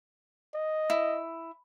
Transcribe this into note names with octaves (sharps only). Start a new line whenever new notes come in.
D#5
E4